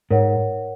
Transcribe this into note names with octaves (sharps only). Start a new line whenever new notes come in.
G#2 A#4 C#5 F#5